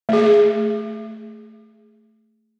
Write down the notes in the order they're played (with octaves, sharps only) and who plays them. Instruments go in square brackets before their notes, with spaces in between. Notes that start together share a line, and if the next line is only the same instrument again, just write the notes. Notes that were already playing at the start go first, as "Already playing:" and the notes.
[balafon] A3 G#4